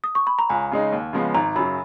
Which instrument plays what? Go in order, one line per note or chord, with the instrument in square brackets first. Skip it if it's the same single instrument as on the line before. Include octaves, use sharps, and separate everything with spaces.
[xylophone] D#6
C#6
B5
A#5
[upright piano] C#2 [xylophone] G#5
[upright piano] C#3 G#3 D#4
D#2
C#3 F3 G#3 B3
[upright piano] G#1 [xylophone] A#5
[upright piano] F#2 C#3 F#3 [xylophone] B5